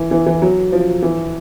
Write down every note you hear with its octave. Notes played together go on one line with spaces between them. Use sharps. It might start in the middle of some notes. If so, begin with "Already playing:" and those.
Already playing: E3
E3
E3
F#3
F3
E3